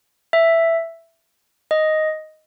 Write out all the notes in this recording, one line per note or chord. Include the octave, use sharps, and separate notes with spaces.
E5
D#5